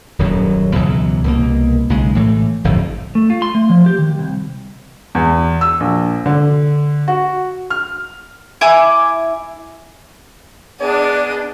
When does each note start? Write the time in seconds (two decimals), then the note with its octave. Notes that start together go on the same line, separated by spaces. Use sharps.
0.19 D#1 F#2 F#3
0.75 C#2 B2 E3 F#3
1.24 C2 B2 A#3
1.90 B1 C#3 G#3
2.15 A2 E3 G3 A3
2.64 G1 F2 A2
3.15 A3
3.30 F4
3.42 C6
3.55 A3
3.70 F3
3.86 G4
3.99 D#3
4.19 C2
5.15 E2
5.61 E6
5.80 A#1
6.26 D3
7.08 F#4
7.70 F6
8.61 E4 G#5 D6
10.80 B3 D4 G#4 D5 D#5